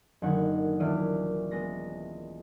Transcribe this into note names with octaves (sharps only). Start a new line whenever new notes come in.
F#1 D3 D#3 F#5 G#6
D#1 E3 A#3 D5 F6 D#7
G#3 B3 A#6